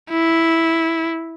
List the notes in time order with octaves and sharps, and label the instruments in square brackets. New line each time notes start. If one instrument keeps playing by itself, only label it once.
[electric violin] E4